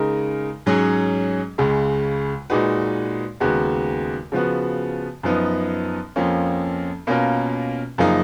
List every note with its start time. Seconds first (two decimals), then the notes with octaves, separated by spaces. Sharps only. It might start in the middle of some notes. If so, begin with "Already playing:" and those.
Already playing: C#3 G#3 D#4 A#4
0.66 G#2 F#3 C#4 G#4
1.58 C#2 C#3 G#3
2.50 A#2 G#3 D#4 F#4 B4
3.40 D#2 C#3 G#3 B3 F#4
4.32 C#3 F3 B3 F#4
5.23 F#2 F3 B3 D#4
6.16 F2 F3 A#3 C#4
7.07 B2 A#3 C#4 F4 A#4
7.98 F#2 C#3 F3 A#3 D#4